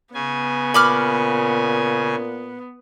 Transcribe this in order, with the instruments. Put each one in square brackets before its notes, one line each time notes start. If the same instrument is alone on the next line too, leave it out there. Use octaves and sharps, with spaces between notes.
[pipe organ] C#3 G#5 [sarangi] B3
[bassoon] A#2 [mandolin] B5 D6 F6